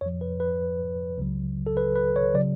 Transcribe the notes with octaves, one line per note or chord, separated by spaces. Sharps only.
F2 F3 C#5
B4
B4
C#2 C#3 F#3
A4
B4
B4
C#5
C#3 F#3 D5